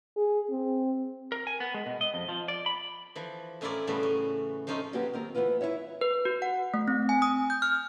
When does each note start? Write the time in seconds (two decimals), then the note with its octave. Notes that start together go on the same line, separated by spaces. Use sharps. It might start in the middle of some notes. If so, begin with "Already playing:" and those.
0.17 G#4
0.50 C4
1.32 A#4
1.47 G#5
1.60 B3
1.74 G#3
1.86 B2
2.01 D#5
2.14 F2
2.29 F3
2.48 D5
2.66 B5
3.16 E3 F3
3.61 A2 C#4 E4 F4 A#4 D5
3.87 A2 C#3 E3 G3 A3 B3
4.03 C#4
4.67 F3 A3 C#4 D#4 F4
4.93 C#3 F#3 A#3 B3 G4
5.14 D#2 C4 A#4
5.35 D2 E3 B3 F4 B4
5.61 E4 B4 C#5 E5
6.01 B4
6.25 F#4
6.42 F#5
6.74 A3
6.88 C4
7.09 G#5
7.22 D#6
7.50 G6
7.62 F6